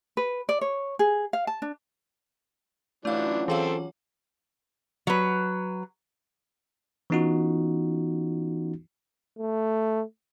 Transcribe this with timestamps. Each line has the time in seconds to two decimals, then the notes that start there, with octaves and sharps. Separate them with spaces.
0.17 B4
0.49 D5
0.61 C#5
0.99 G#4
1.33 F5
1.47 A5
1.62 D4
3.05 E3 F#3 A3 C#4 D4 F4 F5
3.48 E3 C4 G#4 A4 F5
5.07 F#3 B4
7.10 E3 B3 C#4 D#4 F4 F#4
9.38 A3